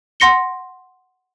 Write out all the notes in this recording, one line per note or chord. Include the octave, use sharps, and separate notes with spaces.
F#5 C6 A#6 C#7 G7